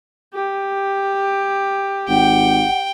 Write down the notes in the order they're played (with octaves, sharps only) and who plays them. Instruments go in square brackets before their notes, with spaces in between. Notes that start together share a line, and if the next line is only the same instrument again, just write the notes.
[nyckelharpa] G4
[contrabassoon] G#1 [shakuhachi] F#5 [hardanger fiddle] G5